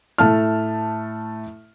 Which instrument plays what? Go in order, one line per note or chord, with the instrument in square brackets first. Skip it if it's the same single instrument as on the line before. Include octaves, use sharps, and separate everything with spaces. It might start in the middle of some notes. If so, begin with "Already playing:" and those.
[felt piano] A2 A3 A5 F6